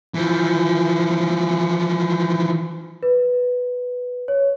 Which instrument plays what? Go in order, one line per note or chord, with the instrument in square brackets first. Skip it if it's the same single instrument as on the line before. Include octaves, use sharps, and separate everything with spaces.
[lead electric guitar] E3 F3
[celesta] B4
C#5